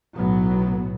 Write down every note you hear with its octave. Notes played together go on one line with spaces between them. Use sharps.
B1 A2 F#3 B3